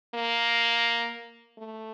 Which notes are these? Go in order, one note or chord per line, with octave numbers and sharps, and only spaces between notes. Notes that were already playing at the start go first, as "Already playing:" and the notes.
A#3
A3